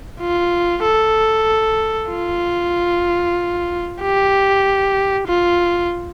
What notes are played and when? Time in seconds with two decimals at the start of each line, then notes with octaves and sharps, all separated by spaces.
0.20 F4
0.83 A4
2.11 F4
4.02 G4
5.28 F4